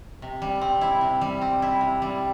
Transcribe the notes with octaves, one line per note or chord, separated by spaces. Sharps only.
C3
G3
C4
E4
C3
G3
C4
E4
C3
G3